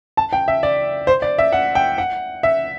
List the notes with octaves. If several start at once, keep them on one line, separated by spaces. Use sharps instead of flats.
A5
G5
E5
D5
C5
D5
E5
F#5
G5
F#5
E5